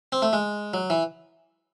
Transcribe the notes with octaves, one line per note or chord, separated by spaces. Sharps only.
C4
A3
G#3
F#3
E3